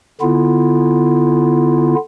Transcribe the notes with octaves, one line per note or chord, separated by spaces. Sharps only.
D3 B3 E4 F4